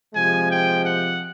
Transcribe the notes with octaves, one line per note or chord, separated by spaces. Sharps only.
C3 F3 G#3 G#5
G5
F#5